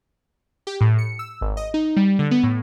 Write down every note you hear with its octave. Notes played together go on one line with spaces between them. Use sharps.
G4
A2
C#7
E6
G#1
D#5
D#4
G3
D3
B3
A2